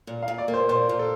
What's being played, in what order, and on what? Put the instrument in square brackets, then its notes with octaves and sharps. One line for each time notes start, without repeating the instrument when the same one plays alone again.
[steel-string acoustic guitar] A#2
[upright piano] F5
[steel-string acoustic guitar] A#2
[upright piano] D5
[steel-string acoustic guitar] A#3
[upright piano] C5
[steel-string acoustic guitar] A#2 [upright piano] C5
[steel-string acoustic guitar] A#2
[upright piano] A4